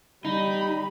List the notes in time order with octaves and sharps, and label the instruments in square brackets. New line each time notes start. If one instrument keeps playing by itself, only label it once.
[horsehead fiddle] G3 B5 [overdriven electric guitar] D#4